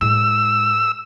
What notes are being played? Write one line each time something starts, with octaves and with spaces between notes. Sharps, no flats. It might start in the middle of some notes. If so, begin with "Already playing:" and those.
A2 G#3 E6